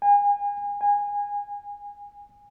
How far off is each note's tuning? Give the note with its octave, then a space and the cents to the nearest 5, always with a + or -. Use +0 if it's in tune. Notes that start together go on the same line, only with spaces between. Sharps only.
G#5 -35
G#5 -25